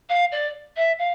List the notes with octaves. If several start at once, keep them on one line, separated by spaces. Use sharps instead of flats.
F5
D5
E5
F5